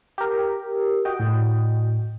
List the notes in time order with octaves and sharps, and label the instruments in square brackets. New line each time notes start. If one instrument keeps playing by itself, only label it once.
[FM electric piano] G4 A#4
F#4 D#5 G5
[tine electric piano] A2